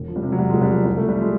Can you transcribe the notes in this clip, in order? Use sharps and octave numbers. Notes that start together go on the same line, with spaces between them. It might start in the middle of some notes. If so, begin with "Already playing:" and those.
Already playing: E1
F3
G3
C3
F#3
E2 G3
G#3
E1
G3
F3 F#3
C2 G3
A3
C2
G3
F3 G#3